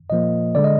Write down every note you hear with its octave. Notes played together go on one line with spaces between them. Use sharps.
A#2 F3 A#3 D#5
D3 G#3 D5
D#5